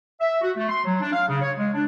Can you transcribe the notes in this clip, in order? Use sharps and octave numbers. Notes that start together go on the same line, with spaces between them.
E5
F#4
A3
C6
F#3
D4
F5
C#3
C#5
G#3
D4